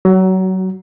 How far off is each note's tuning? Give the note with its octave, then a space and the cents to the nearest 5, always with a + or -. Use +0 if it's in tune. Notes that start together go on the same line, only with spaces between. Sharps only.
F#3 +25 F#4 +0